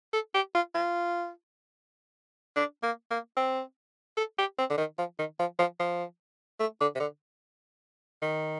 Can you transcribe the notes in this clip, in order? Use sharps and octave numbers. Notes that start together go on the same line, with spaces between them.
A4
G4
F4
F4
D4
A#3
A#3
C4
A4
G4
C4
D3
D#3
F3
D#3
F3
F3
F3
A3
D3
C3
D3
D#3